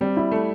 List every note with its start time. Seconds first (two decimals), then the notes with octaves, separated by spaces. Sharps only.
0.01 G3 C4
0.17 E4
0.32 A3